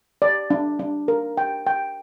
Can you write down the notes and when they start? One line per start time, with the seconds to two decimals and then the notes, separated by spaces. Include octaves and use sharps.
0.22 D5
0.50 D4
0.79 D4
1.08 A#4
1.37 G5
1.67 G5